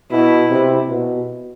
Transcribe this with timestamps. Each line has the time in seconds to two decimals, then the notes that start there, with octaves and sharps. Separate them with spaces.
0.11 B2 E4
0.50 C3
0.88 B2